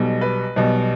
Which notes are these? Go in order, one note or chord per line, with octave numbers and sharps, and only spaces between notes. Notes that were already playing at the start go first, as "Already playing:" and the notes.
Already playing: B1 B2 G3
B4
B1 B2 G3